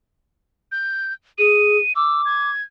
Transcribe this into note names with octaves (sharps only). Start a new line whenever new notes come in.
G6
G#4 D#7
D6 E6
G#6